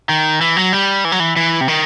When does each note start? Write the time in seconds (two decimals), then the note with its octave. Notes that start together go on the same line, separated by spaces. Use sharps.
0.09 D#3
0.41 E3
0.57 F#3
0.73 G3
1.05 E3
1.12 F#3
1.20 E3
1.36 E3
1.61 C3
1.68 D#3